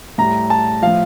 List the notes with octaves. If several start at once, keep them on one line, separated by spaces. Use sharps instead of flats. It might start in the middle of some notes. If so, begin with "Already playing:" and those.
A2 G3 A#5
A5
A2 F3 F5